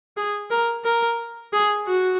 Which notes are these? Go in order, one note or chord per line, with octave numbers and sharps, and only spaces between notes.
G#4
A#4
A#4
G#4
F#4